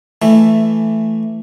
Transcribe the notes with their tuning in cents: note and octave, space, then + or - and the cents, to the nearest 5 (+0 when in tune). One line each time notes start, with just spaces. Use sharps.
E3 +10 A3 +0